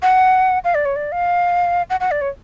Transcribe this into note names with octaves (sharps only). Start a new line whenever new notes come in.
F#5
F5
D5
C#5
D5
F5
F#5
F#5
D5
C#5